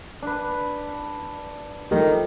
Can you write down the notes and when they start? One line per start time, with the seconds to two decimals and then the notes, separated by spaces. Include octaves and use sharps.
0.22 D4 B4
1.91 D#3 F3 A3 G4